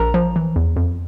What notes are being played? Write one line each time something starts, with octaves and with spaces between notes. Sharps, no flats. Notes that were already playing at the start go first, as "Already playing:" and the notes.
Already playing: A#1 A#4 A#5
F3
E3
E2
F2